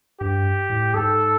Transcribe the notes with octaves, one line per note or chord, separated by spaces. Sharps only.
G2 G4
A2
G#2 A4